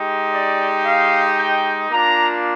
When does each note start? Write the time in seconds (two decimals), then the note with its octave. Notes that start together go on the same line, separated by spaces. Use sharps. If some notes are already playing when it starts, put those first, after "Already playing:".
Already playing: G#3 D#4 G4
0.31 D5
0.84 F5
1.37 G5
1.90 A#3 D4 F4 A#5